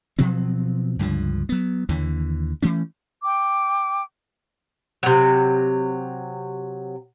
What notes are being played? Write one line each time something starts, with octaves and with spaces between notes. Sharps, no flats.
B2 F3 F#3 C4
C#2 G2 D3 F3
F#3 B3
D#2 D3 E3
E3 A3 C#4
G5 D6
C3 F#3